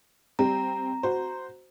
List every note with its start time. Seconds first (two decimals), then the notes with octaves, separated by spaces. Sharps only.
0.39 G3 C4 A#5
1.03 F#4 C5